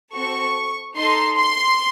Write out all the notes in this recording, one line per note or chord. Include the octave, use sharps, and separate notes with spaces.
C4 F#4 A4 C#6
D#4 A4 C6
C6